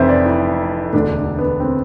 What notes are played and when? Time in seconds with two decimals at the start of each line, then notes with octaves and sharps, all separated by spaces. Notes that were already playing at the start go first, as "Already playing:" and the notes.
Already playing: F1 F2 E3 C5 E5
0.09 D5
0.26 E4
0.93 E1 D2 D3 D4
1.39 B3
1.60 C4